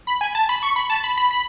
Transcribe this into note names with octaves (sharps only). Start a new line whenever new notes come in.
B5
G#5
A5
B5
C#6
B5
A5
B5
B5
B5